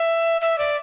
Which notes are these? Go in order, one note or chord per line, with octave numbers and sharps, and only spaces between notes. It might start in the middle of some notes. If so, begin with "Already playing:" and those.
Already playing: E5
E5
D5